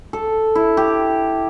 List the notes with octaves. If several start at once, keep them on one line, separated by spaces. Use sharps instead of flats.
A4
E4
G4